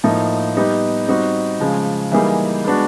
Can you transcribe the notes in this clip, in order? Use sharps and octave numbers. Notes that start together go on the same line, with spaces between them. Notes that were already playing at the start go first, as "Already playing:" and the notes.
A2 F3 A#3 D#4
G3 B3 D#4 G4
G3 C4 D#4 F#4
C#3 F3 G#3
E3 G3 A#3 D#4 G#4
G#3 B3 D4 F#4